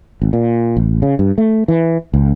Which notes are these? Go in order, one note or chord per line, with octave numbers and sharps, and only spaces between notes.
G#1
A#2
A1
C#3
G2
A3
E3
C#2